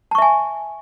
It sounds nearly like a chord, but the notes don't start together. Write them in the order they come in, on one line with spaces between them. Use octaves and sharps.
A5 C#6 E5 G#5